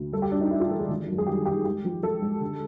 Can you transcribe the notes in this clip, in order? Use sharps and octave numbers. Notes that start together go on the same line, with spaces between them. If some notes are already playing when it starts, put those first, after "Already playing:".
Already playing: D2
G3 A4
G4
G2 D4
D#4
G3 E4
F4
E3 A4
G#4
G#1
F#2
G#4
G3 G4
D#3 G4
G#3 G4
F3
F3 A4
G#3
D3